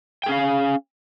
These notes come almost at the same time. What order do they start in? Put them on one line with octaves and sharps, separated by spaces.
G5 G#4 C#4 F5